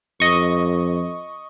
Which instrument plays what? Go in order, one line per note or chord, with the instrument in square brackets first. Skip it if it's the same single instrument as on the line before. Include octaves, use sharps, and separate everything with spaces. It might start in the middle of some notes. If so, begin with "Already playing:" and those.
[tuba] F2 [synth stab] D#5 C#6